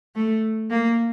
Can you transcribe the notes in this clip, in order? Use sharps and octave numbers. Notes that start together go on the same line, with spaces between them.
A3
A#3